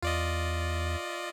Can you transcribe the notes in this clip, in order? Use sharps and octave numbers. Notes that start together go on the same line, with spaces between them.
E2 F4 D5 D#5